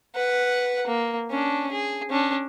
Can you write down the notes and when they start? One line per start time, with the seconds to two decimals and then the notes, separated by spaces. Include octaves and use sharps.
0.15 B4 F#5
0.87 A#3
1.30 C#4 D4
1.71 G#4
2.10 C#4 D4